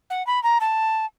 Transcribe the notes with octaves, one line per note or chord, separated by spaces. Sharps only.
F#5
B5
A#5
A5